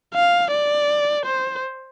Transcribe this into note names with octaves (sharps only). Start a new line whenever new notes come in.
F5
D5
C5